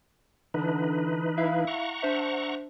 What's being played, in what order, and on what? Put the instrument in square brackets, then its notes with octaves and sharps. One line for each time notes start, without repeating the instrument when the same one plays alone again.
[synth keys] D3 D4 [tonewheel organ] E3 D#4 B4
[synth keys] E4 E5 F5
[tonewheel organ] F#5 A#5 C#6
[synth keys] D4 C5 E5